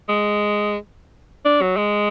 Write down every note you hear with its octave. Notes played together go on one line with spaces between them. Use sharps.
G#3
D4
F#3
G#3